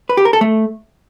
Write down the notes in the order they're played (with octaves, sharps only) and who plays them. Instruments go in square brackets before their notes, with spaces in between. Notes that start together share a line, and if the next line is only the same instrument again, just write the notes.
[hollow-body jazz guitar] B4
G4
A#4
A4
A3